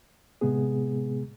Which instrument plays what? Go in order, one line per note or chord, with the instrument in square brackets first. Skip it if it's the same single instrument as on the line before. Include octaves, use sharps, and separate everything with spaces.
[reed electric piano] A2 C3 G#3 B3 G#4